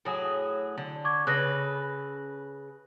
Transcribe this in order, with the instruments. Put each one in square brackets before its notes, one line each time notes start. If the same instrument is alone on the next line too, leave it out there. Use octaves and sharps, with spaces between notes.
[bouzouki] A2 F#3 G#4
D3
[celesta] C#6 D6 G#6
[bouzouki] C#3 A4 B4 [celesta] F#6 A#6